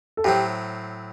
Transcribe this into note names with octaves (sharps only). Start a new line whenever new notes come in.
A4
A2 F#3 C4 G4